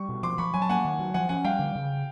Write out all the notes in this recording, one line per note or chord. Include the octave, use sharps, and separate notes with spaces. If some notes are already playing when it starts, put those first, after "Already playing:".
Already playing: G3 C#6
B2
F3 C6 D6
F3 B5 C#6
F#3 G#5
A5
A#3 F#5 G#5
D#3
F#3
F3 F#5 G#5
C#4 F#5 G#5
G3 F5 G5
D3
C#3